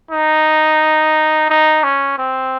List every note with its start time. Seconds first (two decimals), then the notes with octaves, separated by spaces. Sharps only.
0.11 D#4
1.49 D#4
1.84 C#4
2.18 C4